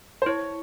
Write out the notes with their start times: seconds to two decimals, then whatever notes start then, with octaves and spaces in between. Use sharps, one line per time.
0.22 C5
0.26 E4 C#5